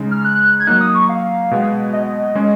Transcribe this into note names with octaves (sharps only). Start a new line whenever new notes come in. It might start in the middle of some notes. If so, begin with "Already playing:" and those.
Already playing: C#3 G#3 D#4
F6
F#6
G#6
F#3 A#3 D#4 F#6
D#6
C#6
F5
B2 G#3 B3
D#5
G#3 C#4 G#4